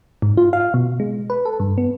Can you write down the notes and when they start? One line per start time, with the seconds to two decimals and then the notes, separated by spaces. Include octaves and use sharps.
0.22 G#2
0.37 F4
0.53 F5
0.74 B2
1.00 G#3
1.30 B4
1.45 A4
1.60 G2
1.78 B3